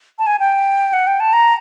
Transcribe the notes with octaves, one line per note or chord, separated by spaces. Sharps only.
A5
G#5
G5
F#5
G5
A5
A#5